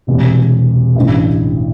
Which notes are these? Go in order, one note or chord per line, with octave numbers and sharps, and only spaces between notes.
E1 E2 C3
A1 G2 E3